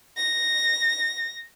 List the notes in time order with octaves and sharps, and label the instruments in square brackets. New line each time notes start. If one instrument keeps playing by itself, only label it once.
[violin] A#6